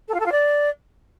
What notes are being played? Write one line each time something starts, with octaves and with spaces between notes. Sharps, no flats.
A4
F4
A4
F4
D5